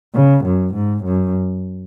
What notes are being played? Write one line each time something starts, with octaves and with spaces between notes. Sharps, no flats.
C#3
F#2
G#2
F#2